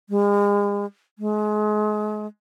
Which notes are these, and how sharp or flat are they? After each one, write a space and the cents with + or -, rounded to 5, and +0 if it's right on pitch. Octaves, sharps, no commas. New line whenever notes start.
G#3 -40
G#3 +30